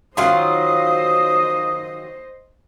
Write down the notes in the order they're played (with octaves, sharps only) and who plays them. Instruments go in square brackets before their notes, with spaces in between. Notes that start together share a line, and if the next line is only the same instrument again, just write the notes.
[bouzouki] D#3 F#3 F4 [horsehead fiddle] C5 D#5 [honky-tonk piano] F5 C6 [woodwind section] D#6